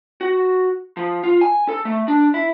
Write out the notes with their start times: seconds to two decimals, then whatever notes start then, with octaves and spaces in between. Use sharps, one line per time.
0.21 F#4
0.97 F3
1.23 F4
1.41 G#5
1.69 A4
1.85 A3
2.08 D4
2.34 E4